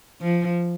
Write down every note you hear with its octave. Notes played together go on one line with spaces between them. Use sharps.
F3